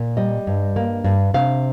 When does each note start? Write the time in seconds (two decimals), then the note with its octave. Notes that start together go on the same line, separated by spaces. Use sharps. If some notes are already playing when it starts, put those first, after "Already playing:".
Already playing: A#2
0.17 G3 D#5
0.47 G2
0.76 A#3
1.04 G2
1.34 C3 F5